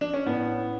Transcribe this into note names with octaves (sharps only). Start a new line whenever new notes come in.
D4
C#4
A2 B3